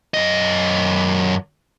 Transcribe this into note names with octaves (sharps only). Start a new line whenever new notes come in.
F#2 D#5